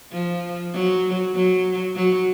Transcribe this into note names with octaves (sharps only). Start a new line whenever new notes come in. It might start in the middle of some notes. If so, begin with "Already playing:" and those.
F3
F#3
F#3
F#3